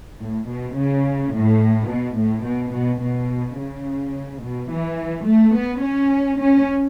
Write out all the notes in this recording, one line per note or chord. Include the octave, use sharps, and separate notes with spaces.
A2
B2
C#3
A2
B2
A2
B2
B2
B2
C#3
B2
E3
A3
B3
C#4
C#4